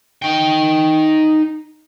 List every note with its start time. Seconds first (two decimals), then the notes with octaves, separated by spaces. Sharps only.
0.22 D#4 G5